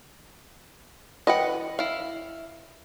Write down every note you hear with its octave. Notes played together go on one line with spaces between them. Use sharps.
E3 B4 D#5 F#5 G5
E4 F5